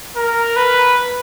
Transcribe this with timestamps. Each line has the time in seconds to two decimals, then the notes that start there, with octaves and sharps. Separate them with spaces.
0.16 A#4
0.56 B4